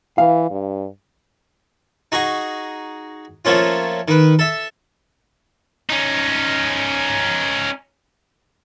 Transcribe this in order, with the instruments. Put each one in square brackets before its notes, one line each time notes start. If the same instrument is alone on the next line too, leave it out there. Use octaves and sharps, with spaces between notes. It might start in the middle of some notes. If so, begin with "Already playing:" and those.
[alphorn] E3 [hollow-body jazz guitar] F5
[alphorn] G2
[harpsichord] D#4 F#4 G#4 C#6
F3 A3 A#3 C#4 F4
D#3 B4
A4 E5
[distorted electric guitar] C#4 D#4